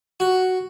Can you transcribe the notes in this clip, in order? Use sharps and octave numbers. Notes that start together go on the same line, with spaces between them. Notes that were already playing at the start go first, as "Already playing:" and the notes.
F#4